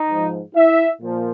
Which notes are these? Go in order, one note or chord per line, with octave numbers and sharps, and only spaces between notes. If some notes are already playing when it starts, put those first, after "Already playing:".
Already playing: D#4 D#5
G#2 F3
E4 E5
A#2 F3